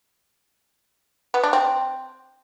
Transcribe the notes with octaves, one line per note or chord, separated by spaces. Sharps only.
B3
D4
C4